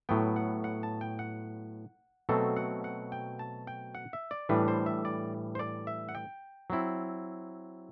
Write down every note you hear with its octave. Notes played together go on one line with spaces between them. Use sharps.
A2 F#3 B3 G5
F#5
F#5
A5
G5
F#5
B2 F#3 A3 C4 A4
F#5
F#5
G5
A5
G5
F#5
E5
D5
A2 E3 G3 D4 B4
C5
E5
D5
C5
D5
E5
F#5
G5
F#3 C4 E4